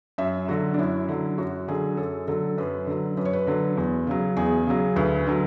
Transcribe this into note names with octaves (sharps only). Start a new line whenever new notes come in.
F#2 E5
D3 F#3 F#4
D4
F#2 E4
D3 F#3
F#2 F#4
D3 F#3 G#4
F#2 A4
D3 F#3 A4
F#2 B4
D3 F#3
F#2 B4
C#5
B4
D3 F#3
E2
C#3 F#3
E2 G#4
C#3 F#3
D2 B4
D3 F#3